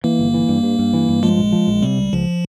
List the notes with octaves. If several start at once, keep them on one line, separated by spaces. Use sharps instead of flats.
E3 A#3
G1
E3
G2
G2
G2
E3
G2
F3 G#3
A#1
F3
A#1
C3 G3
C#2
C#2 F3